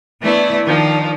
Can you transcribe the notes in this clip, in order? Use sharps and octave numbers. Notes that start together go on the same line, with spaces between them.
E3 A3 B3 D4 E4
D#3 F3 D4